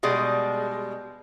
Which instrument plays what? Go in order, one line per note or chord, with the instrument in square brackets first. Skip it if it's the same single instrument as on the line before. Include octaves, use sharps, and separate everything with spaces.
[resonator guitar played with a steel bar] B2 G3 G#3